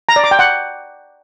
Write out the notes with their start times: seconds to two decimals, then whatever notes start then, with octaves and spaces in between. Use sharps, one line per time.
0.09 A#5
0.16 D5
0.24 D6
0.31 G5
0.39 F#5